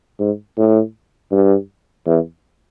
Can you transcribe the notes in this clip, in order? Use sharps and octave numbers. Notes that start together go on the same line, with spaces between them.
G#2
A2
G2
E2